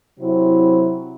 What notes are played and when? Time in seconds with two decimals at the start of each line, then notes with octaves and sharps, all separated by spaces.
0.19 C3 F#3 C4 E4